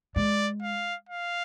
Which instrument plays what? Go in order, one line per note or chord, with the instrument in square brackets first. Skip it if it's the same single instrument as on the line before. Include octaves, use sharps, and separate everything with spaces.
[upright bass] G#3 [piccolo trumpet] D5
[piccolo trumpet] F5
F5